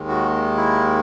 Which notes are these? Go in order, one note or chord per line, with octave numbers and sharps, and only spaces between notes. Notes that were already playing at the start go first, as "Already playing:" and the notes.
Already playing: D#2 D#3 G#3
F#4
E4